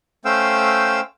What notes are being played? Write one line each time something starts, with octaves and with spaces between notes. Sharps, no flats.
A3 C#4 C5 F5 G5 E6